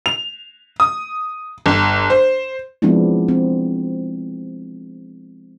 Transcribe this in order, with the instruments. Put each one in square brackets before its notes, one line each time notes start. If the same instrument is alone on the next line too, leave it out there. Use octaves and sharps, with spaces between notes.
[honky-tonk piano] F7
D#6
G1
C5
[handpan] F3 G#3 B3 C4 D4 E4
C4